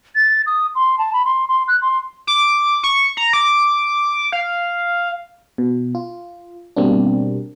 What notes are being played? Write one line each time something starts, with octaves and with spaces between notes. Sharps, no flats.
A6
D#6
C6
A5
B5
C6
C6
F#6
C6
D6
C#6
A#5
D6
F5
B2
F4
B2 G3 A#3 C4 D4